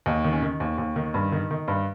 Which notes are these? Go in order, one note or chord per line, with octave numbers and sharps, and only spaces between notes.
D#2 D#4
D#3
C#4
D#3
D#2
D#2
D#3
G2
D#3
D#3
G2